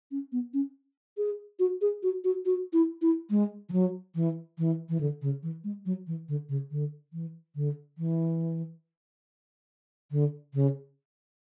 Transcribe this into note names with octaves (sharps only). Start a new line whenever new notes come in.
C#4
B3
C#4
G#4
F#4
G#4
F#4
F#4
F#4
E4
E4
G#3
E3
F#3
E3
E3
E3
D3
C#3
E3
G#3
F#3
E3
D3
C#3
D3
E3
D3
E3
D3
C#3